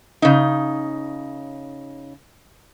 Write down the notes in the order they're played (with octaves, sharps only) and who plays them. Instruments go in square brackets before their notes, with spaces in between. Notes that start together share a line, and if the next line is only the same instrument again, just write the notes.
[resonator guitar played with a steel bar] C#3 D#4